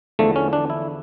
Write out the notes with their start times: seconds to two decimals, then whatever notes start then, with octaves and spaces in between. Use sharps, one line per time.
0.19 E2 D3 F3 A3
0.36 C#4
0.53 D4
0.70 E4